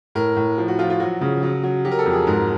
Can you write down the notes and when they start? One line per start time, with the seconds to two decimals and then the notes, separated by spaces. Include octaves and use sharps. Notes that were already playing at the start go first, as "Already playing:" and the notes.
0.15 A2 A#4
0.37 A2
0.58 F3
0.68 F#4
0.79 F3 F4
0.90 F4
1.00 F#3 F#4
1.21 C#3
1.43 F#3
1.64 F#3
1.85 F#3 G4
1.92 A#4
1.99 A4
2.06 F2
2.13 G#4
2.27 G#2 A#4